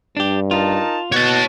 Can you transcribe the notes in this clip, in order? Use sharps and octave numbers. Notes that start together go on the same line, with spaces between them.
G2 D4 G4
D#4 F4 A#4 A5
B2 F#4 C#5 A5